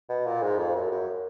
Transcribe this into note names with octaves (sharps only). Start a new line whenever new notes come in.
B2
A#2
G#2
F2
F#2
F#2